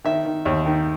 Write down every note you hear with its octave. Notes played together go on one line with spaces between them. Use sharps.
D#3 E5
D#3
D#2
D#3